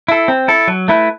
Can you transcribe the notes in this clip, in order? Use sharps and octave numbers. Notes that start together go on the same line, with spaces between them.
E4 A4
C4
E4 A4
F#3
A3 E4 B4